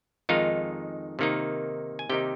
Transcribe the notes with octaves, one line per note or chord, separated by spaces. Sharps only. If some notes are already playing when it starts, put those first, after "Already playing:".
F2 D#3 G#3 D#4 F4 F5
C3 D#3 A#3 D#4
G#5
C3 D#3 A#3 D#4 G4 G5